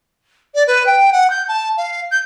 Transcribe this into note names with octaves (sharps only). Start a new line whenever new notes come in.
D5
B4
G5
F#5
G6
A5
F5
G6